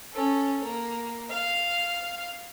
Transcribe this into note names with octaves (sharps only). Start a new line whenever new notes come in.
C#4 A4
A#3
F5